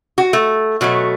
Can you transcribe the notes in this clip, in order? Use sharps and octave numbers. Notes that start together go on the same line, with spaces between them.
F#4
A3
B2 F#3 A3